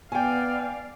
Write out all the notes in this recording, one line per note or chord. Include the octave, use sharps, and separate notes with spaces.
B3 D5 F5 G5 G#5